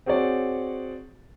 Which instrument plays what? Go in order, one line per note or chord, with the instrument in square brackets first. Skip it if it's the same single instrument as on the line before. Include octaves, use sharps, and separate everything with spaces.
[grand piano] C4 F#4 G#4 C#5 D5